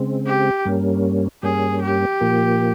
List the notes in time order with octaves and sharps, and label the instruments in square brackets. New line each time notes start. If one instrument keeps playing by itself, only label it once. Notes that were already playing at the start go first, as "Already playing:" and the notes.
Already playing: [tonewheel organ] C#3 G#3 C4
[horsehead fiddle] G4
[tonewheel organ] G2 G3 A#3 C#4
[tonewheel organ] G2 G3 A#3 C#4 [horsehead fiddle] G#4
[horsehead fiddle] G4
[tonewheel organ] A#2 F3 A#3